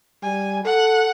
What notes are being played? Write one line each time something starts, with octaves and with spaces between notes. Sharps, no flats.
G3 G#5
A4 F#5